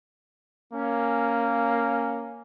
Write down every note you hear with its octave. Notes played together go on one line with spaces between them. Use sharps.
A#3 C#4